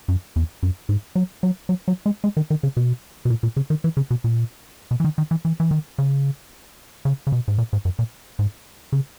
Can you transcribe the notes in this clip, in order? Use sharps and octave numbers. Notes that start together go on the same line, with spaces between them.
F#2
E2
F#2
G#2
F#3
F#3
F#3
F#3
G#3
G#3
D#3
D#3
C#3
B2
B2
A#2
A#2
C#3
D#3
E3
C#3
B2
A#2
B2
E3
D#3
D#3
E3
E3
E3
D#3
C#3
C#3
C#3
B2
G#2
A#2
G#2
F#2
A#2
G#2
C#3